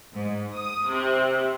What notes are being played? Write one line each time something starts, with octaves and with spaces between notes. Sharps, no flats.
G#2
D#6
C3